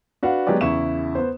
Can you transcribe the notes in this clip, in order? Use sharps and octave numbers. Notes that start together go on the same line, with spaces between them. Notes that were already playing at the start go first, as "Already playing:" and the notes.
D4 F#4 B4 F5 F#5
F#3 G#3 B3 G4 D5
E2 C#3 E4 C#6 E7
B3 C5